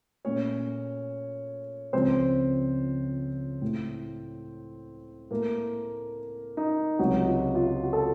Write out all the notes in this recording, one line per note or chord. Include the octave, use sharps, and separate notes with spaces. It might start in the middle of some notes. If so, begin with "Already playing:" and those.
A#2 A3 C#4 C#5
C#2 C#3 F3 C4 C5
A2 A3
A2 A3 A#3 A#4
D#4
C#2 C3 F#3 A3 F#4
F4
F4
F#4
A4